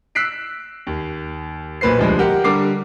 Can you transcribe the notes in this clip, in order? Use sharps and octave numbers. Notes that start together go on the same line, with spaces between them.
E6 F#6 B6 C7 D7
D#2
B1 A#2 B4 C5 C7
D1 C2 D3 F3 G#3
G4 A#4 F#5
D3 G3 A#4 D6 C7